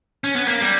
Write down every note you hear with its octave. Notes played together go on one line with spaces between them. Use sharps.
C#4
B3
A#3
G3